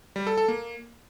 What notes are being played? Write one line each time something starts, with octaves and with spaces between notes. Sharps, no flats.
G3
A4
A4
A#3